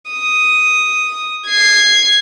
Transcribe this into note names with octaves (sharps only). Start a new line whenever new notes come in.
D#6
G#6 C7